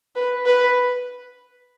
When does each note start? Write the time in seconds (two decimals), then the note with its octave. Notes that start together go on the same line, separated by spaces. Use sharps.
0.16 B4
0.46 B4